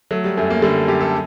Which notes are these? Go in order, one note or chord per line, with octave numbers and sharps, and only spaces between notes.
F#3 A3
G3
F#2 A3
A#3
D3 G3
F#2 G4
A4